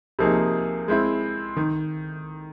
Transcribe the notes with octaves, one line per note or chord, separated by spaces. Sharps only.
C3 F3 A#3 D#4 G#4
G#3 C4 E4
D#3